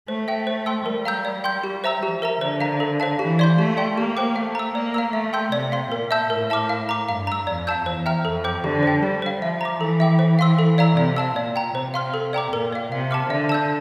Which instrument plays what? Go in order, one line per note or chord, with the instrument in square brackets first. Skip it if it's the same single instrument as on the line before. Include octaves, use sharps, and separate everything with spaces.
[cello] A3 [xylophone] C5
[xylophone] E5 G5
C5
G5 C6 E6
[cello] G3 [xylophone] A#4
[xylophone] F5 A#5 E6 G6
D5
G5 C6 G6
G4
C5 E5 A#5 E6
[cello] F3 [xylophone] G4
[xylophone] A#4 E5 A#5
[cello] D3 [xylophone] C5
[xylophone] F5 A#5
A4
C5 F5 A5
[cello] E3 [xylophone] G4
[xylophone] D5 F5 C6 G6
[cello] A3 [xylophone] G4
[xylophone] D5 G5 C6
[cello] A#3 [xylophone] G4
[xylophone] C5 G5 D6
[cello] A3 [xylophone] F5
[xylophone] A#5 E6
[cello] A#3 [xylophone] D5
[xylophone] F5 A#5 E6
[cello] A3 [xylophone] E5
[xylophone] G5 C6 E6 G6
[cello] C3 [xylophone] D5
[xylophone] F5 C6
[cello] A#2 [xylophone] A#4
[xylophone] E5 A5 E6 G6
[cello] A2 [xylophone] A#4
[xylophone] E5 A5 D6 F6
F5
A#5 D6
[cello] G2 [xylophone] F5
[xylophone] A#5 E6
[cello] F2 [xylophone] D5
[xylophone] F5 A5 E6 G6
[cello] E2 [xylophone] C5
[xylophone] E5 G5 A#5 F6
[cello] F2 [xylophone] A4
[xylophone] C5 G5 D6 G6
[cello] D3 [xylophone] G4
[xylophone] C5 G5
[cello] G3 [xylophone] G4
[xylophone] C5 F5
[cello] F3 [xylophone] E5
[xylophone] A#5 D6
[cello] E3 [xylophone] A4
[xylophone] E5 G5 D6
C5
F5 C6 E6
A4
D5 F5 A#5 E6
[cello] C3 [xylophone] D5
[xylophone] F5 A5 E6
[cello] A#2 [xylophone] D5
[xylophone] G5 A#5
[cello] C3 [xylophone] C5
[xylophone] F5 C6 F6
A4
D5 G5 A#5 D6
[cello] A#2 [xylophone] A#4
[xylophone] D5 F5
[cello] C3 [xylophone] F5
[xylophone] A5 D6 F6
[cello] D3 [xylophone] E5
[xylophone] A5 E6 G6